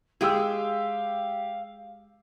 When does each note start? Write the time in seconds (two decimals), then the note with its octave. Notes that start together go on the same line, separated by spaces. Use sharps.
0.21 G#3 G4 G#4 F5 G5 E6